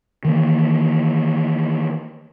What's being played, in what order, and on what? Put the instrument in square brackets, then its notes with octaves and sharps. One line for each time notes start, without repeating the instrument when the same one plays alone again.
[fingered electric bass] D#3 E3 G#3 A#3